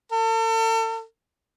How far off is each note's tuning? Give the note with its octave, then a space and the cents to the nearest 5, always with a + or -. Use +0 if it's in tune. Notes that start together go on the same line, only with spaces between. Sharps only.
A4 +40